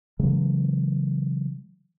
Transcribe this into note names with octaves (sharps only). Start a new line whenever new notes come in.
C#3 E3 F#3 G#3